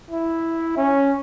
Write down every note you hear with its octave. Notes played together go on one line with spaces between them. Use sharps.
E4
C#4